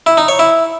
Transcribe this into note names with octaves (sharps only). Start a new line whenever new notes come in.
E4
D#4
C#5
E4